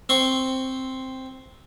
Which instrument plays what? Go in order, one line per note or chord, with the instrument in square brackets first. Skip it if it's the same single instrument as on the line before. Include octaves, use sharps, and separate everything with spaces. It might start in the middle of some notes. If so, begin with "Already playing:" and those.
[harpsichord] C4 C6 C#6